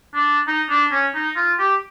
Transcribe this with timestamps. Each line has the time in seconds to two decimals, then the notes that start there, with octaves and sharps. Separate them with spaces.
0.14 D4
0.47 D#4
0.69 D4
0.91 C#4
1.15 D#4
1.36 F4
1.59 G4